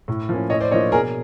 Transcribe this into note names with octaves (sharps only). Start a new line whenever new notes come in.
A2
F3 A#3 C#4
A2 C#5 D#5
C5 D5
F3 A#3 D4 C#5 D#5
B2 G#4 A#4